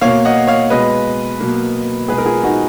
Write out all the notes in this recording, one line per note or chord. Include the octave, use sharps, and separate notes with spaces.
B2 A#3 C#5 F5
D#5 F#5
C#5 F5
B2 G#3 B4 D#5
B2 F#3 A#3
B2 G#3 G#4 B4
A#4
F4 G#4
D#4 F#4